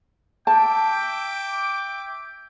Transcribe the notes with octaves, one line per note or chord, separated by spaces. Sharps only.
E5 G5 A5 D6